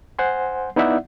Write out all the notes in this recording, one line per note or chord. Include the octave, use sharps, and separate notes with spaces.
C5 F#5 G#5 C6
B3 D#4 E4 D5 E5 F#5